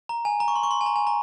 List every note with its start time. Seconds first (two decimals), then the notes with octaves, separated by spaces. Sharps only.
0.09 A#5
0.25 G#5
0.40 A#5
0.48 C#6
0.55 C6
0.63 C#6
0.71 C6
0.81 G#5
0.86 A#5
0.96 G#5
1.07 A#5